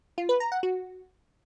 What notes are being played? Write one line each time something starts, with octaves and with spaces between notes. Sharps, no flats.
F4
B4
A#5
F#5
F#4